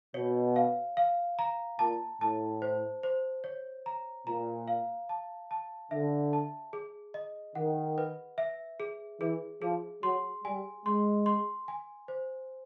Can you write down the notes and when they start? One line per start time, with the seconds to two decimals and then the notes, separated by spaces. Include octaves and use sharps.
0.14 B2 C#5
0.56 F5
0.97 F5
1.39 A#5
1.79 A#2 A5
2.21 A2 A5
2.62 C5
3.03 C5
3.44 C#5
3.86 A#5
4.27 A#2 A#5
4.68 F5
5.09 A5
5.51 A5
5.91 D3 E5
6.33 A5
6.73 G#4
7.14 D#5
7.55 D#3 F#5
7.98 B4
8.38 E5
8.80 G#4
9.20 E3 G#4
9.62 F3 G#4
10.03 F#3 C6
10.44 G3 G#5
10.85 G#3 C6
11.26 C6
11.68 G#5
12.08 C5